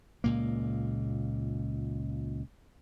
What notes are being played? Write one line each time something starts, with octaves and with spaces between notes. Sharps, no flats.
C#2 A#2 A#3